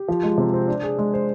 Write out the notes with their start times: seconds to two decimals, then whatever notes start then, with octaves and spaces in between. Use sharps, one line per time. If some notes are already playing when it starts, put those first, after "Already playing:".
Already playing: G4
0.08 F3
0.23 G#3
0.38 C3
0.53 C4
0.68 D4
0.83 G#4
0.99 G#3
1.14 C5